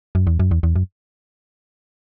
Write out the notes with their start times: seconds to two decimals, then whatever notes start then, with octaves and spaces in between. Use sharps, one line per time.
0.15 F#2
0.27 E2
0.39 F#2
0.51 E2
0.63 E2
0.76 F#2